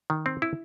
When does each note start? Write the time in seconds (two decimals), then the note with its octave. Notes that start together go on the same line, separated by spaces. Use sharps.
0.10 D#3
0.26 C4
0.42 E4